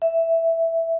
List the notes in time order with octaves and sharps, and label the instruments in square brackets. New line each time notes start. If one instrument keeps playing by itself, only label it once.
[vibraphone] E5